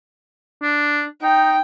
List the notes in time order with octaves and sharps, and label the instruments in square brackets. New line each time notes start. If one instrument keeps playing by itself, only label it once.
[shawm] D4
[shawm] D#4 [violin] G5